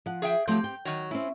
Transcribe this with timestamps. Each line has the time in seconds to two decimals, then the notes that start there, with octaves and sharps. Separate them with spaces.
0.06 F3 F#5
0.22 G#4 E5 G5
0.48 F3 F#3 A3 C4 G4
0.64 G5
0.85 D#3 F#3
1.11 C4 C#4 E4